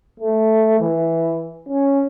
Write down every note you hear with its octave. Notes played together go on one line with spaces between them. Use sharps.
A3
E3
C#4